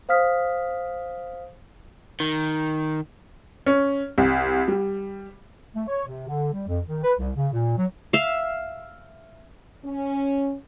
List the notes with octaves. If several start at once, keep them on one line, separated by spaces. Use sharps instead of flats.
C5 F5 D#6 F6 B6
D#3
C#4
C2
G3
A3
C#5
C3
D3
G3
F2
D#3
B4
C2
C#3
A#2
F#3
E5 F5
C#4